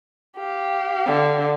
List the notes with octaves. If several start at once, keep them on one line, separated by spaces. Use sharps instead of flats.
G4 F5
D3